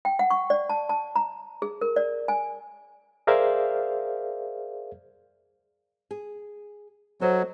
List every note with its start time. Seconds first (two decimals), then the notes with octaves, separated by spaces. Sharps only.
0.05 G5
0.19 F#5
0.31 C#6
0.50 D5
0.69 A5
0.89 A5
1.16 A#5
1.62 G#4
1.81 A#4
1.96 D5
2.28 G#5
3.27 G#4 A#4 C5 D5 E5 F5
6.11 G#4
7.21 F#3 A4 C5 D#5